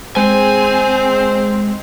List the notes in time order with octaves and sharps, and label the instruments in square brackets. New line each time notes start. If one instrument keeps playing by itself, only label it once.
[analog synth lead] G#3 [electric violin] C4 [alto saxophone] C5 [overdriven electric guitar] G#5